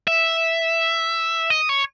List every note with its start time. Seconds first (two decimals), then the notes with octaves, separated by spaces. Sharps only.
0.08 E5
1.50 D#5
1.69 C#5